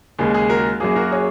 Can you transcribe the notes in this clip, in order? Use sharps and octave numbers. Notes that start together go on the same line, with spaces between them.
D#2 C#3 G#3
G#4
F#4 A#4
F#2 F#3 A#3 G#4
F#4 A#4
G#4 C#5